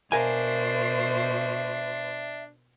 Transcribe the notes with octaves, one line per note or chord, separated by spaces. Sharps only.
B2 D4 A#4 C5 E5 F5 G#5